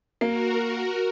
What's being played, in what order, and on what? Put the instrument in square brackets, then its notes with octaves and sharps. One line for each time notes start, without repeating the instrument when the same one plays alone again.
[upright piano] A#3 [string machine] F#4 A#4